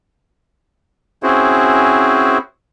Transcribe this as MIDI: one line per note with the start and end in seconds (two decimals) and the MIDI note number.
1.23 2.38 60
1.23 2.38 61
1.23 2.38 64
1.23 2.38 66
1.23 2.38 68
1.23 2.38 72